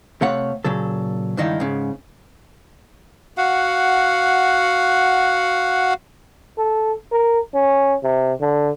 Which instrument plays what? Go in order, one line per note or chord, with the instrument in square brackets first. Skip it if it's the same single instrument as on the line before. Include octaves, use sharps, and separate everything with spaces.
[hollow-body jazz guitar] C3 A3 C#5 F5 F#5
A#2 C#3 F#3 A4
C#2 G2 D#3 D#4 E4 F5
G#2 C#3
[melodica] F#4 F5 F#5
[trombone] A4
A#4
C#4
C3
D3